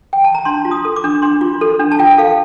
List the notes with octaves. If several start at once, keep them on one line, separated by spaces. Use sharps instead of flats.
G5
A5
A#5
D4 C6
F4
D#6
A4
D6
D4
D4 C6
F4
A4
D4
A5
F4 G5
A4 F5